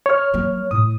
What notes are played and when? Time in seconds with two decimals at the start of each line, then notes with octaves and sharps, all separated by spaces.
0.06 C#5 F6
0.34 F#3 A#3
0.71 A2 D#6